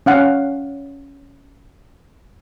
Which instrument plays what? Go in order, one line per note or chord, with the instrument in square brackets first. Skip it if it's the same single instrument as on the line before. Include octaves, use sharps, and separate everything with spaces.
[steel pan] C#4 F5 F#5